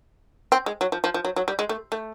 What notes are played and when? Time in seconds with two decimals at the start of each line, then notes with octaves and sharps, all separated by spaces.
0.52 C4
0.66 G#3
0.81 F#3
0.92 F3
1.04 F3
1.14 F3
1.25 F#3
1.36 F#3
1.48 G3
1.59 G#3
1.69 A3
1.92 A3